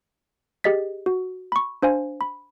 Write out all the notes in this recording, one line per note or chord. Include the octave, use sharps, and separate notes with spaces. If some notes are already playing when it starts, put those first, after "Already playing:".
G4 G#4 D#5 A6 B6
F#4
B5 C#6
D4 C5 F5 G#5
B5